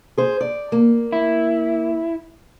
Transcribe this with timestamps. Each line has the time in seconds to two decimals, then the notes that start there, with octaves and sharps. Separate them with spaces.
0.18 G#4 C5
0.41 D5
0.72 A#3
1.12 E4